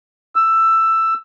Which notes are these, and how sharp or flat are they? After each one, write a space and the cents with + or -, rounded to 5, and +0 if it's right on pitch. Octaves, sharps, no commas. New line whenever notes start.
E6 +10